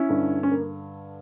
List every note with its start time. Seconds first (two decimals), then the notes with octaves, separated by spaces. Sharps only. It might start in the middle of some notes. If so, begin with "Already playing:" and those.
Already playing: C#4 E4
0.09 G2 D3
0.43 C#4
0.51 A#3